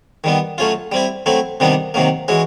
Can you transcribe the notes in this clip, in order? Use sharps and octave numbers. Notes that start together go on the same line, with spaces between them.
D#3 G3 B3
F#3 A3 C#4 F4
G3 C4 E4
F#3 A3 C4 E4
C3 D#3 G3 B3 D4
C3 D#3 F#3 A#3
E3 G#3 C#4 F#4